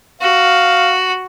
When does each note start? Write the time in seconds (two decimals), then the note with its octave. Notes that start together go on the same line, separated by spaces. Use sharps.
0.22 F#4 F5